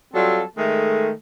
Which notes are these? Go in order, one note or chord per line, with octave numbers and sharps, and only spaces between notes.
F#3 G3 C4 F4 A4
D#3 G#3 A3